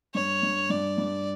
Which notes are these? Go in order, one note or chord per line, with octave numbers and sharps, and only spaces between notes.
G2 C#5
G2
G2 D5
G2